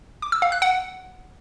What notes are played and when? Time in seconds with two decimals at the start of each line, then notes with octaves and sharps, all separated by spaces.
0.22 D6
0.32 E6
0.42 F5
0.52 F#6
0.62 F#5